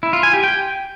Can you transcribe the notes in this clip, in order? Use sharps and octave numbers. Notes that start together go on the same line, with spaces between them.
E4
F4
G#5
G4
G5